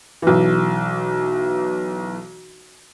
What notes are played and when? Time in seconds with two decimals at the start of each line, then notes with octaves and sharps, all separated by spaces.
0.22 B1 E3